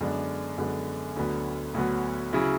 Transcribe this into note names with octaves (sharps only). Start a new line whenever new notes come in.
F#2 D3 G#3 B3 D4
F#2 D3 G#3 B3 D4
D2 D3 F#3 B3
D2 D3 F#3 B3
C#3 F#3 C#4 E4